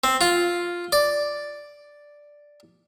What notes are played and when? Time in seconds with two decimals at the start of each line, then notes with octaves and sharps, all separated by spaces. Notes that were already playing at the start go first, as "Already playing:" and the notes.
0.04 C4
0.21 F4
0.92 D5